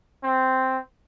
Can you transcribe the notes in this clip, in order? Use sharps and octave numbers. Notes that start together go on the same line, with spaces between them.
C4